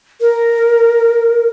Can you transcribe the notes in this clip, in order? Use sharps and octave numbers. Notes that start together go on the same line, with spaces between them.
A#4